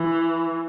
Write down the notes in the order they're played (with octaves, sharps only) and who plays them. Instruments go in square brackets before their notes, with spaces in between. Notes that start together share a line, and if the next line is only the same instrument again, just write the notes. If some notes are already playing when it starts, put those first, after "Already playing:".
Already playing: [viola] E3